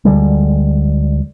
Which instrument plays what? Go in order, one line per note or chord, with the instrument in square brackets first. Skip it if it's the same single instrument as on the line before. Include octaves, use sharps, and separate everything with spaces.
[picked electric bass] D2 D3 G3 G#3